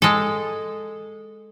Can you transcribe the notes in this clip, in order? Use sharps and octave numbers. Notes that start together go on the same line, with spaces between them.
G#3 A4